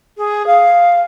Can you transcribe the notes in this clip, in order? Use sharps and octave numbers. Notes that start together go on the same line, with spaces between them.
G#4
F5